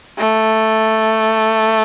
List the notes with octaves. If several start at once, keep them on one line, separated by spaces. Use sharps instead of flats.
A3